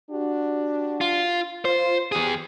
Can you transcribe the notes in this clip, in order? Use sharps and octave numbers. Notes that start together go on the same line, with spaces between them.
D4 F#4 G4
F4
F4 C5
E2 G4 G#4